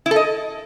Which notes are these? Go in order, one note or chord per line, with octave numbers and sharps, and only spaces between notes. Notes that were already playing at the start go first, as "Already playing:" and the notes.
E4
A4
D#5